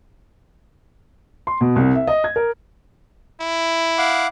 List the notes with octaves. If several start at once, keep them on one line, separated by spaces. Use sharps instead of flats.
C6
B2
C2
E5
D#5
G#6
A#4
E4
F5 F#5 D6